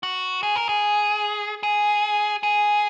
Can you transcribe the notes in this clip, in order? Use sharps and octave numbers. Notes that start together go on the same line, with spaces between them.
F#4
G#4
A#4
G#4
G#4
G#4